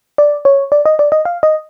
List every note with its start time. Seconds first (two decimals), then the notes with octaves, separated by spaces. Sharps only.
0.18 D5
0.45 C#5
0.72 D5
0.86 D#5
0.99 D5
1.12 D#5
1.25 F5
1.43 D#5